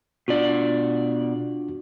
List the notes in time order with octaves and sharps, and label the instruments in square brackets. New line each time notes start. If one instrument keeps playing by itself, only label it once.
[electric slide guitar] B2 D5 [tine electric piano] D4 F4 F#4